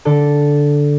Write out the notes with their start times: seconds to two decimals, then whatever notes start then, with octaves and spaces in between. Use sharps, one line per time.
0.05 D3 D4 A4